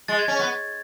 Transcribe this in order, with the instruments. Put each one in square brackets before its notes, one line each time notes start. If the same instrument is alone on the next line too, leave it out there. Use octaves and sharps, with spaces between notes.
[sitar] G#3 [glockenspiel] A6
[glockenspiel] G#6
[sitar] C#4
B3